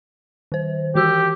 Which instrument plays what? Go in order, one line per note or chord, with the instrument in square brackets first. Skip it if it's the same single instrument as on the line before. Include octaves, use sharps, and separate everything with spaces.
[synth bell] D#3 C5
[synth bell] E3 F#4 E6 [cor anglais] G4